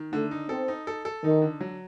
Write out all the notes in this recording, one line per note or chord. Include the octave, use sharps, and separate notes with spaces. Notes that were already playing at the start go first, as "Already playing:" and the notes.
Already playing: D#3
D3 A3
D#4
C4 A4
D#4
A4
A4
D#3 D#4
D3
F#3